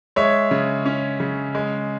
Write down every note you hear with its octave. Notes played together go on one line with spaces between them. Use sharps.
G#3 C#5 E5
C#3
C#4
C#3
G#3